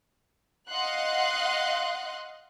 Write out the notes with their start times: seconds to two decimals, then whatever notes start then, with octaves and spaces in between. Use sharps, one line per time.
0.70 D#5 F5 F#5 C6 F#6